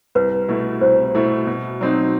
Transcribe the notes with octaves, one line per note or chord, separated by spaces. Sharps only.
C2 B4
B2 A3 E4
C2 C5
B2 A3 E4
B2
F#3 C4 D#4